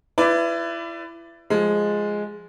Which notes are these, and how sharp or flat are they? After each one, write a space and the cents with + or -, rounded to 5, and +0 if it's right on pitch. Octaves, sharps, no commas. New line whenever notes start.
E4 +30 B4 +20 D5 +0
F3 +0 G#3 +0